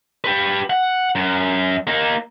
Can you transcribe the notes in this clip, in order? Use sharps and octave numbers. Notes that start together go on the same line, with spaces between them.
G4 B4
F#5
F#2
A#3 D#4